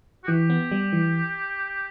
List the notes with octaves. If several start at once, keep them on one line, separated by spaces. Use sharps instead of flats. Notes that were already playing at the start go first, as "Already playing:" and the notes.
F#4
E3 G4
B3
G3
E3